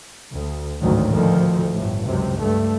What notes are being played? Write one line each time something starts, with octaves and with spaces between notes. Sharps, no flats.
D2
A1 D2 G#2 D#3 F#3
D2 D#3 F3
G1 A2
C#2 F#2 C3
G2 A3